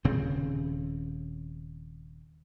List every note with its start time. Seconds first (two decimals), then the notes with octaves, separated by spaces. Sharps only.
0.04 D#1 C#3 C4